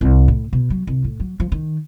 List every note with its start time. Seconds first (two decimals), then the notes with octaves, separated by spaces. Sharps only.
0.01 C2
0.28 A2
0.53 B2
0.70 F#3
0.87 C2
1.04 A2
1.20 F#3
1.40 F3
1.52 D#3